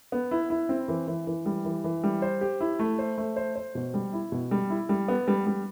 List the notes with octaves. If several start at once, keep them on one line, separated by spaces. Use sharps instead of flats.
B3
E4
E4
C4
E3
E3
E3
G3
E3
E3
G3
C5
G4
E4
A3
C5
A3
C5
C5
B2
G3
E4
B2
G3
E4
G3
B3
G3
G3